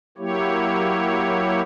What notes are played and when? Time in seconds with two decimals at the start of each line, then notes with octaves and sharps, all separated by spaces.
0.18 F#3 A#3 E4 G4 C#5